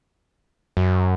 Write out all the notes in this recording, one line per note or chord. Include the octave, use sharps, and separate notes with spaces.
F#2